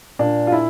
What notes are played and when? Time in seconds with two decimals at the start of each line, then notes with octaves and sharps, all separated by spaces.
0.19 A#2 D4
0.47 F4
0.52 E4